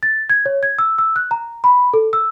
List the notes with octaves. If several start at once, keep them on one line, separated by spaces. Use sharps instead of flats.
A6
G#6
C#5
G#6
E6
E6
F#6
A#5
B5
A4
E6